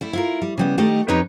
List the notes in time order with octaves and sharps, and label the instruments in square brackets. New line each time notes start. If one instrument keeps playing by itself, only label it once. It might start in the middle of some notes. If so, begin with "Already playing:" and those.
[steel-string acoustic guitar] G3 A3 E4
E4 F4 A#4
G3
C#3 G3 B3
D#3 G3 A3 D#4 G4 D#5
F2 C4 D#4 G4 B4 C#5